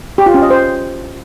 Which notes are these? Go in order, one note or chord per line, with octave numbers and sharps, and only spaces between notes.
G4
F4
C#4
D#5
C5